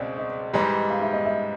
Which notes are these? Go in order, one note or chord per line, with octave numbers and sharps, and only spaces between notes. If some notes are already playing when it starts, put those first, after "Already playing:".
Already playing: C#2 B2 C4 D5 D#5
D#5
G#2 E3 G3 D#5
F5
E5
D#5
E5